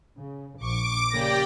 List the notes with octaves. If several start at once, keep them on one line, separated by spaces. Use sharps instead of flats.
C#3
A#1 C#6 D6 D7
C#3 A#3 G4 D5 G5 A#6